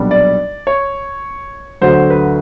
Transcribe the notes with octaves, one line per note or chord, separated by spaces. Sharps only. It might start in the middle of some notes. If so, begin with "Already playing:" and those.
Already playing: B1 A#2 G3 B3 D4
D5
C#5
D2 D3 F#3 C5
B4